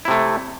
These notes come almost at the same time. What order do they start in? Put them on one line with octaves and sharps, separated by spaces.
E4 C3 A3